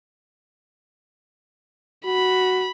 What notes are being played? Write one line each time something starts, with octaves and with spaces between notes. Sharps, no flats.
F#4 B5